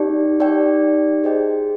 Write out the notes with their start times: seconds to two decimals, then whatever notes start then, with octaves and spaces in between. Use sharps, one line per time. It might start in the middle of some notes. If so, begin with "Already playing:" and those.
Already playing: D#4 G4 D5 G5
0.40 D#4 G4 D5 G5
1.24 G#4 C5 D#5 G5